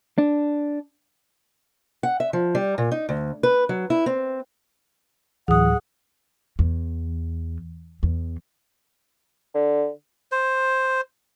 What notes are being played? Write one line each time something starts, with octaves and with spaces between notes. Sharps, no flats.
D4
F#5
E5
F3
G3
A#2
D#4
D2
B4
F#3
E4
C4
D2 A2 E3 F#3 G#4 F#5 D#6
E2
E2
D3
C5